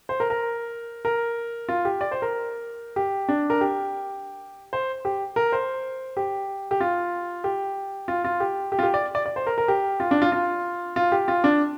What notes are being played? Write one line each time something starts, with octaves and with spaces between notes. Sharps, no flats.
C5
A#4
A#4
A#4
F4
G4
D5
C5
A#4
G4
D4
A#4
G4
C5
G4
A#4
C5
G4
G4
F4
G4
F4
F4
G4
G4
F4
G4
D5
D5
D5
C5
A#4
A#4
G4
F4
D4
F4
F4
F4
G4
F4
D4